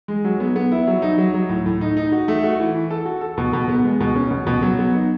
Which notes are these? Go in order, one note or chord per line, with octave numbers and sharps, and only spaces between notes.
G#3
F#3
B3
B3
E4
F#3
D#4
F#3
F#3
A2
A2
D#4
D#4
F#4
A3
F#4
E3
E3
A4
F#4
A4
B2
B2
B3
G#3
B2
C#4
B2
B2
F#3
B3
D#4